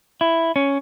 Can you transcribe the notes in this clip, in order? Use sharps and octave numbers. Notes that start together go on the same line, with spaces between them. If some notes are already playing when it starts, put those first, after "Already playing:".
E4
C#4